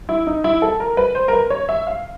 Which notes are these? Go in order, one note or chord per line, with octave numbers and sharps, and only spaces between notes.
E4
D#4
E4
A4
A#4
B4
C5
A#4
B4
C#5
E5
F5